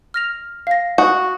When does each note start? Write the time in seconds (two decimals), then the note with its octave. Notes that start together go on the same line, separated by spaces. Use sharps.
0.14 F6 A#6 F7
0.67 F5 A#6
0.98 F#4 D#6